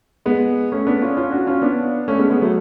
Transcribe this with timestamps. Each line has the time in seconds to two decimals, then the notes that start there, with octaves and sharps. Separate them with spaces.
0.26 G#3 B3
0.72 A3 C#4
0.87 B3 D4
1.02 C#4 F4
1.17 C#4 F4
1.32 D4 F#4
1.47 C#4 F4
1.62 B3 D4
2.08 A3 C#4
2.19 G#3 B3
2.30 G#3 B3
2.41 F#3 A3